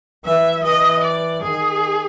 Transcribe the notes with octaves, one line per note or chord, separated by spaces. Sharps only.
E3 E5
E3 D#5
D5
D#3 G#4